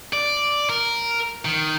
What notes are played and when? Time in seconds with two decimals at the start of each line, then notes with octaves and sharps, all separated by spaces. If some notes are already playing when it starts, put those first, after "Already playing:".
0.13 D5
0.70 A#4
1.45 D#3